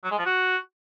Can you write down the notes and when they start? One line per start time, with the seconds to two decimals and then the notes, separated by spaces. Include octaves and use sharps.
0.04 F#3
0.11 G#3
0.18 F3
0.26 F#4